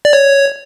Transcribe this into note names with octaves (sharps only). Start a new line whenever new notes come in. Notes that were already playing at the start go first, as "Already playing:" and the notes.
D5
C#5